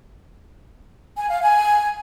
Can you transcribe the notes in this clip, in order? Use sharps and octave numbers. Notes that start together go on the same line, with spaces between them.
G#5
F5
G#5